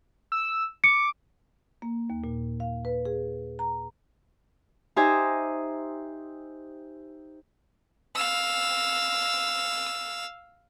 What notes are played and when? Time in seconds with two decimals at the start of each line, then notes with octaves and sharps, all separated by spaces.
0.32 E6
0.84 D6 C#7
1.82 A#3
2.10 D#2
2.24 A#2
2.60 F5
2.85 B4
3.05 G#4
3.59 A#5
4.96 D#4 G4 C5 D#5 E5 G#5
8.16 F5 E6